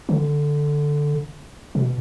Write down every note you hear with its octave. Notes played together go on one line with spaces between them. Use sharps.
D3
B2